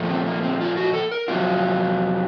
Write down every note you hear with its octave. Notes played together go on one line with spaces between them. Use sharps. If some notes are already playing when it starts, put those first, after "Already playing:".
Already playing: A#2 F3 A3
C4
A#3
C4
F4
F#4
A4
A#4
F2 C3 F#3 F4